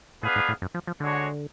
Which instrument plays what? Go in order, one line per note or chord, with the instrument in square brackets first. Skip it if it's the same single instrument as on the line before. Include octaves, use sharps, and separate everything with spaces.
[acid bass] A2 [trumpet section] B3 D4 G#4 B4 F5
[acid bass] G#2
A2
F#2
F3
F3
[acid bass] D3 [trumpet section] G#3 D4 F#4 C#5